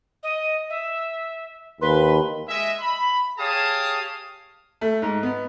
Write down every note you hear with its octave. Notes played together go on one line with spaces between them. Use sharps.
D#5
E5
D#2 B4 C6
G#3 D#5 E5
B5
G4 G#4 C#5 F5 A5 D#6
A3
G#2
B3